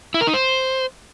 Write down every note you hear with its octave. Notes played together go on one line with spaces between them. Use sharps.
E4
A#4
D#4
C5